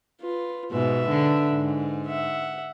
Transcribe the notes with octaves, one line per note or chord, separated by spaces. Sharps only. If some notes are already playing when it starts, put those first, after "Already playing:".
F4 B4
G#2 B2 B4 E5
D3
G#2
E5 F#5